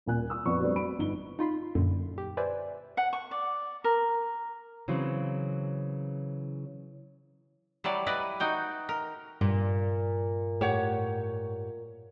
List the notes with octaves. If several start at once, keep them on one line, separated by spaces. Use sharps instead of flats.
D#1 A#2 G#5 F#6
D#6 E6
F2 B3 B4 D5 C#6
G3 A3 B3 C4 D4 F#4
F#3 B5 D7
G1 D#4 G7
D#4 F4 B5 C6
F#2 A#2 D3
G4
B4 C5 D5 E5 G5 G#5
F#5
C#6
D5
A#4
C#3 E3 F#3 C4
F#3 G3 E4 D5
E4 B4 D5 D#5
D#4 F#4 G5
A#4
G2 A#2
A2 G4 C#5 F#5